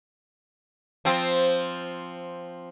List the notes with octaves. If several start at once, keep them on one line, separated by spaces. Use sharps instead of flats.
F3 C4